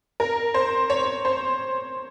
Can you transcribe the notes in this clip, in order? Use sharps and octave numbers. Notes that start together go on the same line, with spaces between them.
A#4
C5
C#5
C5